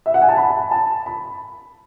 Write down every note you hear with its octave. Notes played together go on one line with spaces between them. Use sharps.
E5
F#5
G#5
A5
B5
A5
B5